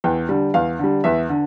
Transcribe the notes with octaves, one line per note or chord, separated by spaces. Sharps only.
E2 G5
D3 G3
E2 F5
D3 G3
E2 E5
D3